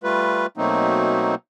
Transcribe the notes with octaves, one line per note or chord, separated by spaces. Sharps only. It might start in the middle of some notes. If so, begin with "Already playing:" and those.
G3 A3 F4 B4
B2 F#3 A3 A#3 C4 D#4